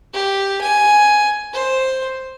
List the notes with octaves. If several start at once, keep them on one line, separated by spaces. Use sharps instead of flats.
G4
G#5
C5